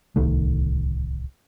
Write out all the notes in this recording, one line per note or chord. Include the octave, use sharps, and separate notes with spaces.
D1 C2 D#3 A3